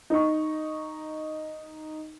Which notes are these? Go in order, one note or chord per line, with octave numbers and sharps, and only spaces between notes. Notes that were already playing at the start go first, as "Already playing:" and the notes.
D#4 C#6